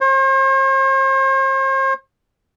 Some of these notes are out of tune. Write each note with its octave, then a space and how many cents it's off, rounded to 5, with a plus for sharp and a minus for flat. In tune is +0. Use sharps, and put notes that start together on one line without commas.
C5 +45